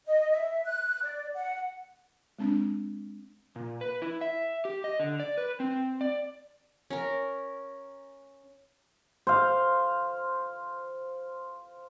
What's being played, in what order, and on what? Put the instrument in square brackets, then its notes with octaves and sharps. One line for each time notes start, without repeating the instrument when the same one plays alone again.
[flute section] D#5
E5
F#6
D5
F#5
[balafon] G#3 C4 D4
[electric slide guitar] A#2
B4
E4
E5
G4
D#5
D3
D5
B4
C4
D5
[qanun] C#4 A#4
[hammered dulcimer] C5 F5